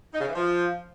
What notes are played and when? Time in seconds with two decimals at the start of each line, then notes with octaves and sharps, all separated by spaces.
0.14 D#4
0.21 C#3
0.28 E3
0.35 F3